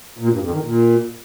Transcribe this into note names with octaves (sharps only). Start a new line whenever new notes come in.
A#2
G2
F2
D#3
A#2